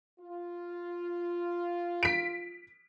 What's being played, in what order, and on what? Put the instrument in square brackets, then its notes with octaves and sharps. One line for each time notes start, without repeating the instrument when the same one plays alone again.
[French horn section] F4
[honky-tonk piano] B6 D7